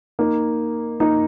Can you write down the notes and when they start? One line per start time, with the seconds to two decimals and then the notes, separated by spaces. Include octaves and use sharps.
0.19 A#3 D#4
1.00 A#3 D#4